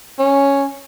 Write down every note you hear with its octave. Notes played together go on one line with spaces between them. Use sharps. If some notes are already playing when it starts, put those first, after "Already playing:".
C#4